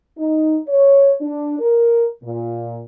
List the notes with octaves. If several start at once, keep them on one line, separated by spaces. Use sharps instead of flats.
D#4
C#5
D4
A#4
A#2